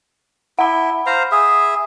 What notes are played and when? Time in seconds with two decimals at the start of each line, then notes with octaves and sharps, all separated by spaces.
0.59 E4 F#5 B5
1.06 C5 F5 A#5
1.32 G#4 E5